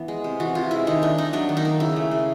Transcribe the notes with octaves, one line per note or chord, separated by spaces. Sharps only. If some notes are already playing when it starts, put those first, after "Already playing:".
Already playing: E3 B3
G#3
C3
E3 F#4
C3 F4
G#3 E4
D#3 D#4
A#3 D4
D4 D#4
F#3 D4
D#3
D#4
A#3
C#3 E4
A3
C#3